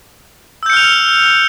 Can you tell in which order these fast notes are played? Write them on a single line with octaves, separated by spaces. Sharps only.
E6 G6 C#7 F6 F7